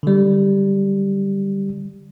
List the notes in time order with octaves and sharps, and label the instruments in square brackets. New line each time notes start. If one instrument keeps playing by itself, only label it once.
[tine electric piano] D3 G3